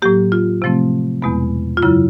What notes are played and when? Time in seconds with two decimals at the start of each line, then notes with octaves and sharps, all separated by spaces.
0.02 A2 F#3 A#3 G4
0.32 F4
0.62 C3 F3 A3 C4
1.22 E2 B2 G#3 B3
1.77 F4
1.82 F#2 C#3 F#3 E4